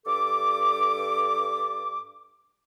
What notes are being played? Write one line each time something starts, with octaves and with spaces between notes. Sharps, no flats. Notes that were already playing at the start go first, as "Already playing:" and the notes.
G2 A4 D6